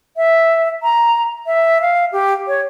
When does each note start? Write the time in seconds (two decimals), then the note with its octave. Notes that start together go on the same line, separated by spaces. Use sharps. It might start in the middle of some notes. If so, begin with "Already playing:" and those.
0.17 E5
0.83 A#5
1.46 E5
1.81 F5
2.12 G4
2.48 C#5